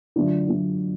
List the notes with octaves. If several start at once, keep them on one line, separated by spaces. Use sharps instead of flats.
D3 F#3 A3 D4 F4
D3 F#3 A3 D4